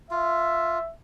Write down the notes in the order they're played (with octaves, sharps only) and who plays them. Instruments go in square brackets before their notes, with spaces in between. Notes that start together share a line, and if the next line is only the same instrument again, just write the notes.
[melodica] F4 [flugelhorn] E5